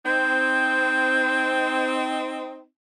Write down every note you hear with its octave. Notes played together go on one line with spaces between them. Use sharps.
C4 D#4 G6